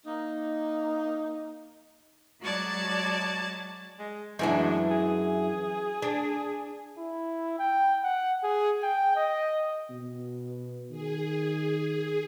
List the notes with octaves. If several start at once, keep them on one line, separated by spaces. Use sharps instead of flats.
A#3 D#4
F#3 G#3 F#4 D5 A5 G#6
G#3
F#2 E3 G#3 D4
G#4
D4
E4
G5
F#5
G#4
G5
D#5
B2
D#3 G#4